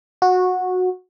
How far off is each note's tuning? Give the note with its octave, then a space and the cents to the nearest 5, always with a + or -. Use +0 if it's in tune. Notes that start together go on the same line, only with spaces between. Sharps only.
F#4 -15